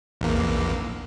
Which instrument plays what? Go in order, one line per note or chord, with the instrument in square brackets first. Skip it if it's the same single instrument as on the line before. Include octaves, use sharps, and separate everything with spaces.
[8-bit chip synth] A#1 E2 A#3